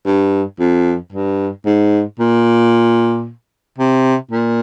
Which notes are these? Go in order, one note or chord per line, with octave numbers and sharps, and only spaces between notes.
G2
F2
G2
G#2
A#2
C3
A#2